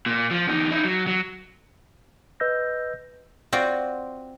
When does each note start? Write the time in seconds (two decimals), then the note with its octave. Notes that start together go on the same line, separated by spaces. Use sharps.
0.06 A#2
0.31 F3
0.47 E2 D#4
0.72 D#4 E4
0.84 F#3
1.07 F#3
2.40 B4 D#5 E6 G6 A#6
3.53 C4 F4 F#4 D5